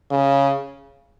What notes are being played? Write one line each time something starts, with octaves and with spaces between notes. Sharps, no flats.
C#3